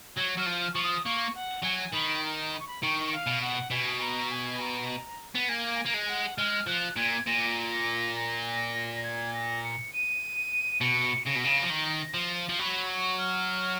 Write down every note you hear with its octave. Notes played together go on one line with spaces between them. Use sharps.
F#3 G#6
F#3 F6
F3
F6
F3 C#6
D#6
A#3 C#6
F#5
F#3 G#5
D#3 B5
A#5
B5
C#6
B5
D#3 C#6
F5
B2
F#5
B2 G#5
A#5
G#5
A#5
B3
A#3 G#5
G#5
A#3
G#3
F#5
G#3 F6
F3 F#6
A#2 G#6
A#2 A#6
A#6
A#6
A#6
G#6
A#6
C#7
D#7
B2 C#7
C#3 A#6
B2
C#3
F3
D#3
F3
F3
F#3 B5
C#6
F6